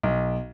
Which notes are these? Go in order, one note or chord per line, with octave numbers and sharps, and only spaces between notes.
B1